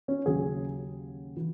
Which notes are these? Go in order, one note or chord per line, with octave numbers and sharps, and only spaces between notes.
C#4
D#2 C#3 F#3 G#4
E3